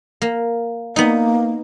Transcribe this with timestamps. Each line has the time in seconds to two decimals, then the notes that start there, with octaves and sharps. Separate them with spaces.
0.22 A#3
0.96 A#3 B3 D#4